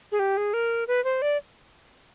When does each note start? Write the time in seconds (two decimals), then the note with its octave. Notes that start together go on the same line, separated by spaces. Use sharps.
0.12 G#4
0.19 G4
0.37 G#4
0.53 A#4
0.87 B4
1.04 C5
1.22 D5